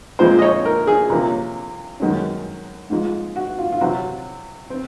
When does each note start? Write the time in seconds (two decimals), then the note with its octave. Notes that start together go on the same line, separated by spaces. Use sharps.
0.19 A#2 F3 G#3 C4 C5
0.39 D#5
0.42 C#5
0.65 A#4
0.87 G#4
1.10 C3 F3 A#3 C#4
2.00 F#2 D#3 G#3 C#4
2.90 G#2 F3 G#3
3.36 F#4
3.59 F4
3.72 F4
3.81 C3 F#3 C4 F#4
4.70 C4